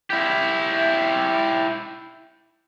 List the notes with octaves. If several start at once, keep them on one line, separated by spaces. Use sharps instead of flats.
E4 G4